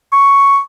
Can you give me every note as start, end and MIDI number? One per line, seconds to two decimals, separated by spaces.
0.12 0.59 85